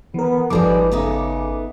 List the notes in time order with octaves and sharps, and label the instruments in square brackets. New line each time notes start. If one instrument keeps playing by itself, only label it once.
[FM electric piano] E3 A#4 [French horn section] B3
[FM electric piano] G#1 A4 D6 [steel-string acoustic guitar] F3 G3 G#4 [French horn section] D#4 B4
[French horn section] C#3 [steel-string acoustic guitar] B3 D#4 E5